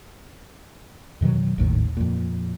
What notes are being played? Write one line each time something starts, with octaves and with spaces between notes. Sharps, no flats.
F2 B2 D#3 F#3
G#1 D#2 A2 D#3
F2 A#2